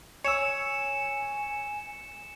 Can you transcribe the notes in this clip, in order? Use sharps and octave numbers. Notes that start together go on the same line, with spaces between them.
C#5 G#5 E6 C#7 E7